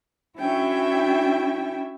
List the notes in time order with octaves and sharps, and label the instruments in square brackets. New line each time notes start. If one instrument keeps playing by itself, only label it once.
[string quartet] C#4 D4 E4 F#4 E5 G5